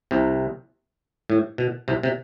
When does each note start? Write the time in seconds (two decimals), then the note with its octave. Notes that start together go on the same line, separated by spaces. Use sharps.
0.11 C2 C3
1.30 A2
1.58 B2
1.88 C2 C3
2.03 C3